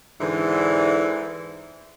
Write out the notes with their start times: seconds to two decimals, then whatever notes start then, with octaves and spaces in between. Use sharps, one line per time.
0.21 G#2 D3 E3